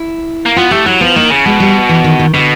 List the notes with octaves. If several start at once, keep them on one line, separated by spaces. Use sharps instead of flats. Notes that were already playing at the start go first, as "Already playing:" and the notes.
Already playing: E4
A#3
B3 F4
A3 G4
F#3 E4
F3 B3
D#3 A#3
C#3
B2 G#3
G3
E3
D#3
D#3
B2 D3